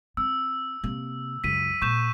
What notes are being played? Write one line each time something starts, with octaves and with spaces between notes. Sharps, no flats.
C4 E6
C3 A#3
C#2 F#2 B6 D#7
A#2 C#6 G6 E7